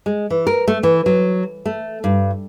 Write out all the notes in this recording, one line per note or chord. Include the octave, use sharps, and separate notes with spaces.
G#3
E3
A#4
A3
E3
F#3
A3
G2